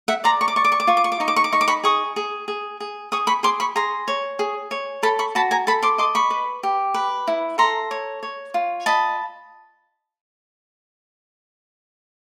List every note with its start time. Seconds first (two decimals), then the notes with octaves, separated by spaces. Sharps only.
0.08 E5 F#5
0.24 D5 A#5 C6
0.41 C#6
0.48 D6
0.56 D5 C#6
0.64 D6
0.72 C#6
0.80 D6
0.87 F4 C#6
0.97 D6
1.04 C#6
1.12 D6
1.20 D#4 C#6
1.28 D6
1.36 C#6
1.44 D6
1.52 D#4 C#6
1.61 D6
1.68 B5 C#6
1.84 G#4 C#6 D#6
2.16 G#4
2.48 G#4
2.80 G#4
3.12 G#4 C#6 D#6
3.27 B5 C#6
3.43 G#4 C6 D6
3.60 B5 C#6
3.76 G#4 A#5 C6
4.08 C#5
4.39 G#4
4.71 C#5
5.03 A4 A5 B5
5.19 B5 C#6
5.35 F#4 A5 B5
5.51 G#5 A#5
5.67 A4 A5 B5
5.83 C6 D6
5.98 D#5 C6 D6
6.15 B5 C#6
6.31 B4
6.63 G4
6.94 B4
7.28 E4
7.58 A4 A#5 C6
7.91 C#5
8.23 C#5
8.54 F4
8.86 D#5 A5 B5